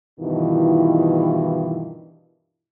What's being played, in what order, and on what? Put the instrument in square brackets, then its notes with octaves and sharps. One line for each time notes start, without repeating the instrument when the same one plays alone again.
[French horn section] G2 B2 D#3 E3 E4 F4